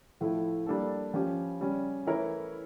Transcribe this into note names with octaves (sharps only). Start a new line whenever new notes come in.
A2 F3 A3 E4
G3 A#3 D4 A4
F3 C#4 G4
C#3 G3 C#4
E3 A3 E4 A#4 C#5